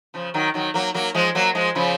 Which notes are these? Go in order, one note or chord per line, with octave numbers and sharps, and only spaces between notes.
C#3 F3
D#3 F#3
D#3 F#3
F#3 A#3
F#3 A#3
F3 G#3
F#3 A#3
F3 G#3
C#3 F3